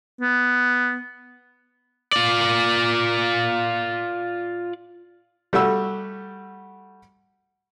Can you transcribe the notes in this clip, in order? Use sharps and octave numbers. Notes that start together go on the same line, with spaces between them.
B3
F4 D5
G3 A3 F#4 E6